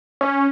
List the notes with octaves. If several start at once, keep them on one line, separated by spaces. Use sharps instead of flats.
C#4